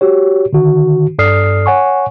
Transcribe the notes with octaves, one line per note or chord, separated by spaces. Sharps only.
F#4 G4 C#5
D3 D#3 F#4
G2 A4 D5 D#6 F6 C7
C#5 F#5 G#5 C#6